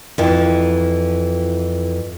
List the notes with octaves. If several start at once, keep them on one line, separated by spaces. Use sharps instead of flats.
F2 E3